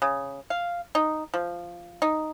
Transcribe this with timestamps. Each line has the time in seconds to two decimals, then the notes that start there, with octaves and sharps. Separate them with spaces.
0.02 C#3
0.50 F5
0.95 D#4
1.34 F3
2.02 D#4